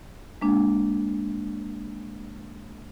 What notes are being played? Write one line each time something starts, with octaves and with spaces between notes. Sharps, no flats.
G#3 A#3 D4